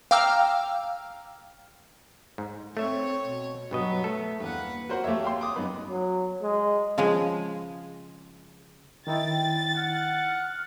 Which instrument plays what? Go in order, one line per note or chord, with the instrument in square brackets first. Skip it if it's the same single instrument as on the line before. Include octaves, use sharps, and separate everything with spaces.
[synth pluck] F5 G5 A#5 D6 E6 F6
[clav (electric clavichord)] G#2
[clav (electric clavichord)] A3 E5 [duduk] C4 [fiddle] C#5
[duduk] B2
[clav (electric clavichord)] G2 B2 D#5 [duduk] F#3 [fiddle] B3
[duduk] A3 [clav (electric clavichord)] A4
[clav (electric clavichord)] E2 G2 [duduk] A#3 [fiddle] B4 F#5
[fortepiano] F#4 A#4 C5 F#5
A3 A#3 G4 C#5 E5
F5 G5 C6
D6 D#6
F#2 B3 D#4 B4
[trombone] F#3
G#3
[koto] C#3 F3 G#3 G#4
[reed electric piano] D#3 D#4 E4 [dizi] G5 [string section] A6
[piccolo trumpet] F#5 [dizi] F6